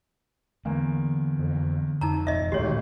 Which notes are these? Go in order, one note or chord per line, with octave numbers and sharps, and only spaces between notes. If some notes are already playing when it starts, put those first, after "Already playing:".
E2 D3 A#3
F2
F2 D#4 A5 A#5
E1 A1 D#5 E5
D1 G#1 D2 A#2 D3 D#3 G4 C#5